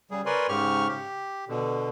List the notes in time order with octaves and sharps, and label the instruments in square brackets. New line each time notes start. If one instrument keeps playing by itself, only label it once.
[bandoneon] C#3 G3 G#4
A#4 B4 C#5 D5 G#5 C6
G#2 C#3 G4 C#6 F6
G4
B2 D3